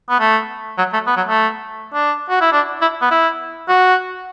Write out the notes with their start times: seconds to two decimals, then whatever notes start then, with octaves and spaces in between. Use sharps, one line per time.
0.09 B3
0.20 A3
0.78 F#3
0.93 A3
1.07 B3
1.17 F#3
1.27 A3
1.94 D4
2.30 F#4
2.41 E4
2.52 D4
2.81 E4
3.01 B3
3.11 E4
3.69 F#4